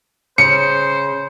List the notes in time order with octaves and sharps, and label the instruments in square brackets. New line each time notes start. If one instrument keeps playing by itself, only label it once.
[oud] C#3 [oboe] C5 [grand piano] C#7